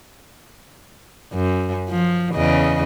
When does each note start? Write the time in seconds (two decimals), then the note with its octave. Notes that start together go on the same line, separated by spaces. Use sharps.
1.34 F#2
1.89 F3
2.35 E2 C#3 D#5